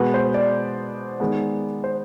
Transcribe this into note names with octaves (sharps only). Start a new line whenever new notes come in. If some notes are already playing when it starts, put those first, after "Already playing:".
Already playing: B2 G#3 B3 B4
C5
D5
D#3 G#3 B3
C5